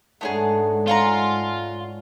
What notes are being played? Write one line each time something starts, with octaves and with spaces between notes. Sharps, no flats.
G#2 D3 F#3 G#3 A3 B3 D#4 G#4
C#4 F4 F5 F#5 A#5